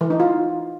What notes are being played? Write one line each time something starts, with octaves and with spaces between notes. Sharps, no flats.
E3
D#4
F4